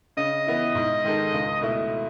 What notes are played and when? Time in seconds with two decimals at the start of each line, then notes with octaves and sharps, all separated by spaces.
0.17 C#3 D#5
0.46 E3 B3 E4
0.75 G#2
1.04 D#3 G#3 D#4 A4
1.33 C#2
1.61 B2 A3 E4